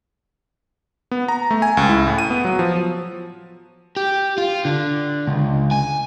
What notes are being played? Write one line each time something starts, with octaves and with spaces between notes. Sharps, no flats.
B3
A#5
A3
G#5
C#2
E4
A2
D#7
B3
F#3
F3
G4
F4
D3
C#2
G#5